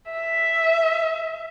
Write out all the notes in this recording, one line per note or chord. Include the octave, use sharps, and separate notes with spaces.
E5